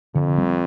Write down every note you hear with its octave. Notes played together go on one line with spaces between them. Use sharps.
F2 D3
G3 C4